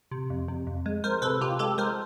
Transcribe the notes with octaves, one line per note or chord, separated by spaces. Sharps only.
C3
F2
C3
F2
G#3
G#3 A#4 C5
C3 A4 B4
C3 F4 G4
G#3 G4 A4
G#3 A#4 C5